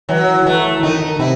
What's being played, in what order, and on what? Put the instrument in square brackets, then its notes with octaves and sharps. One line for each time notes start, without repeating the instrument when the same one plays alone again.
[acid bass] E3 [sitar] F#3
[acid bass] E3 [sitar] A3
[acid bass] D#3 [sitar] D#4
[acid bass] C3 [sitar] E4